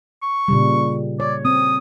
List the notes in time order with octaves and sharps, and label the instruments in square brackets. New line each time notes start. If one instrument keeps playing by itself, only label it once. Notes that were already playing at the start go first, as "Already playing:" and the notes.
[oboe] C#6
[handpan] A#2 C#3 G3
[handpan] C#5 [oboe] D5
[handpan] C4 [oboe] D#6